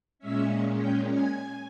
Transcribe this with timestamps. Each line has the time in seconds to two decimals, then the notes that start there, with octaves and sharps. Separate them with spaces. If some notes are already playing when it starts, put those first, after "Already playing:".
0.19 A#2 G#3 C#4 E5 E6
0.80 G5 G6
1.10 G#5 G#6